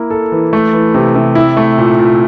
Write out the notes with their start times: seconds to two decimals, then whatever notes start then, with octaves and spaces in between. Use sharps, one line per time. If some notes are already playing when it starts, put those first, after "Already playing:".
Already playing: A#3 E4
0.10 A4
0.32 E3
0.53 A3
0.73 E3
0.95 C3
1.15 C3
1.35 E4
1.57 A3
1.78 A#2
1.99 A#2